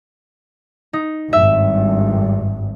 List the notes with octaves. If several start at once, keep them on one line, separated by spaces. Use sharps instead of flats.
D#4
G#1 G2 E5